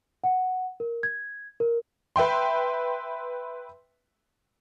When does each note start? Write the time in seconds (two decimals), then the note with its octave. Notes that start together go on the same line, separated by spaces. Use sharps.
0.24 F#5
0.80 A#4
1.03 G#6
1.60 A#4
2.16 B4 E5 G5 C6